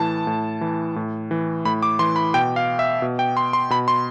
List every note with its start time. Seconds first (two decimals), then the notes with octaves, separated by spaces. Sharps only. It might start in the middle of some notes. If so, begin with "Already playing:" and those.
Already playing: A2 E3 A5
0.27 A2
0.61 E3
0.96 A2
1.31 E3
1.65 A2 B5
1.83 D6
1.99 E3 C6
2.16 B5
2.34 B2 G5
2.56 F5
2.79 E5
3.02 B2
3.19 G5
3.37 C6
3.53 C6
3.70 B2 B5
3.88 C6